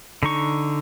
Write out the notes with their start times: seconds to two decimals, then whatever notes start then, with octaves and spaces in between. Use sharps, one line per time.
0.23 D3 D#4 C#6